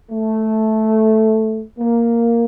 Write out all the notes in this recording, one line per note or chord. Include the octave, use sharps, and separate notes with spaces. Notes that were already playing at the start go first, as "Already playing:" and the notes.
A3
A#3